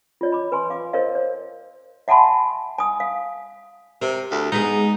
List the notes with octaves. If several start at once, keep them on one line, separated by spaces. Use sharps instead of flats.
F4 C#5 D#5
B5 D6
B4 G#5 C6
F5 D6
A#4 C5 C#5 D#5 F5
C5 C#5
E5 F#5 G#5 A5 B5 C6
G#5 D#6
F5
C3 A#4
D2
G#3 B3 D#4 G#4